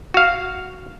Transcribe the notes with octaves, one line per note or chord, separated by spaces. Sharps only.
F#4 F5